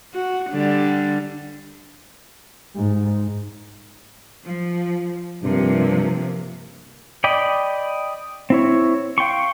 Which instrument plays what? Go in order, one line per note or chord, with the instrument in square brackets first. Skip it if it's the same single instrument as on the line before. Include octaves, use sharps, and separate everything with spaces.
[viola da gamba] F#4
D3 G3
[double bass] G#2
[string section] F3
[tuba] G2 [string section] C3 F3 A#3
[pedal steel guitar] D5 D#5 G5 B5
C4 E4 C#5
F5 G5 C6 C#6